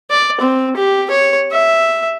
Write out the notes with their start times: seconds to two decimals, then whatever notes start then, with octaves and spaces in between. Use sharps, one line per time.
0.11 D5
0.41 C4
0.76 G4
1.11 C#5
1.51 E5